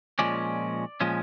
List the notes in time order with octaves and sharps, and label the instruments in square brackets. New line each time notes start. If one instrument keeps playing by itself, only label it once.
[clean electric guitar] A#2 F3 G#3 C#4 D5
A#2 F3 G#3 C#4